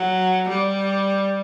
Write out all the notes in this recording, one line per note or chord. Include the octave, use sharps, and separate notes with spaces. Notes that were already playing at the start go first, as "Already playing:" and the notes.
Already playing: F#3
G3